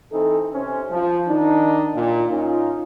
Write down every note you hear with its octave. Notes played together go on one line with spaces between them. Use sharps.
E3 C4 D#4 A4
C3 C#4 C5
F3
D#3 D4 D#4
A#2
C#4 D#4 F4